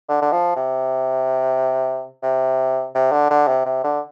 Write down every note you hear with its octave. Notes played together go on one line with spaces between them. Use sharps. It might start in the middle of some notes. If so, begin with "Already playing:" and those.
D3
D3
F3
C3
C3
C3
D3
D3
C3
C3
D3